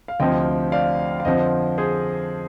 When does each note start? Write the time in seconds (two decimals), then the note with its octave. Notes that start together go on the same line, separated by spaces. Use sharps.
0.08 F5
0.20 D2 C3 F3 D#5 G5
0.72 D5 F5
1.20 F5
1.25 F2 D3 F3 C5 D#5
1.78 G#4 C5